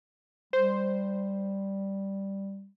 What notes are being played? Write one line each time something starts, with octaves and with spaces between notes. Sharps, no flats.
G3 C5